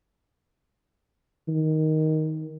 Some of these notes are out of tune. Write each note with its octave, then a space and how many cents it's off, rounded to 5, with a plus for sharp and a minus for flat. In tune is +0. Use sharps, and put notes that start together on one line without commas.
D#3 +10